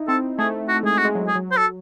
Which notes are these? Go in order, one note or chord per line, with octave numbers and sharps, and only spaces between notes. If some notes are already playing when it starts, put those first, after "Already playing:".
Already playing: D#4 E4
C4 A4
A3 G#4
F#4
A3
G#3 G#4
F#4
G#3
F#3
G#4
F#3
C5
A4